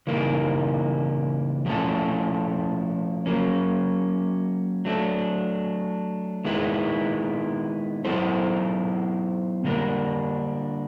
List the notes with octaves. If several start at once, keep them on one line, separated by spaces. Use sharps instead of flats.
C#3 E3 G3 A#3 D#4
F3 A3 C#4 E4 A4
F#3 A#3 C#4
F#3 A3 D4
D#3 G#3 B3 E4
F#3 B3 E4 A4 C5
D3 G3 A#3 D4